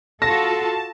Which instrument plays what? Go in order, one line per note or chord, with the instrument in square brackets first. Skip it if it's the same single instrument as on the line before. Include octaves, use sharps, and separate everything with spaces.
[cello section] F4 F#4 A4 [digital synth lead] A5 [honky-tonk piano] A#6